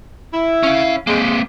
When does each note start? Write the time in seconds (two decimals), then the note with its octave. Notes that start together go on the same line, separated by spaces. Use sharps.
0.33 E4
0.63 C#4 F5
1.07 G#3 A#3 C4